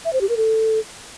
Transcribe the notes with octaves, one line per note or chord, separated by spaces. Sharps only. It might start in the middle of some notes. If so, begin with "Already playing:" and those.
E5
C5
G4
A#4
A4